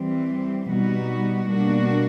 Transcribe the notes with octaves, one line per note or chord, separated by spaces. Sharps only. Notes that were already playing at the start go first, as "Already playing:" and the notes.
Already playing: E3 G3 C4
B2 G3 B3 D#4 F#4
B2 G3 A#3 D4 F#4